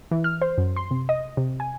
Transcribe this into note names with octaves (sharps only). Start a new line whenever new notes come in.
E3
F6
C5
F#2
C6
C3
D#5
C3
G#5